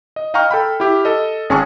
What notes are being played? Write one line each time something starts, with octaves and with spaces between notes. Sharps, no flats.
D#5
D#5 F5 G5 A#5 C#6 F6
A4 G5 B5
E4 G4
A4 D#5
G#1 C#4 G#4 G#5 A5 C#6